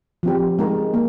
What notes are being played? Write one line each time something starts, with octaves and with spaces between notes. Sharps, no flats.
F3 C4 G4
G#3 D#4 A#4
A#3